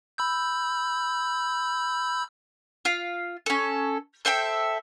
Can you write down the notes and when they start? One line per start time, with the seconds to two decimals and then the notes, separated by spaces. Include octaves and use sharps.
0.18 B5 E6 G6
2.85 F4 F5
3.46 C#4 A4
4.25 A4 C5 E5 G5